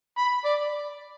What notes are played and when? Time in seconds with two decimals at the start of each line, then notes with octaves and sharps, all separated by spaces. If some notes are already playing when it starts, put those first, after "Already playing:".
0.18 B5
0.45 D5